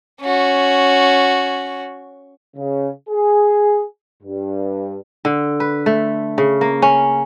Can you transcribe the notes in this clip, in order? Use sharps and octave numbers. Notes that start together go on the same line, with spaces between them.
C#4 F#4
C#3
G#4
G2
D3
B4
A3
C#3
A#3
C#4